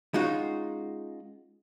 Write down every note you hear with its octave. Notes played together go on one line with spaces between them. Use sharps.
G#3 C#4 D#4 F4 F#4